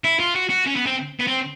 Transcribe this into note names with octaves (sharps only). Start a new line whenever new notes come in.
E4
F4
F#4
F#4
C#4
B3
C4
B3
C4